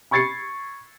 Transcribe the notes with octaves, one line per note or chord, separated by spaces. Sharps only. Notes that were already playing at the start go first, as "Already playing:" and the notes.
B5 C#6 G#6 A6 C7 C#7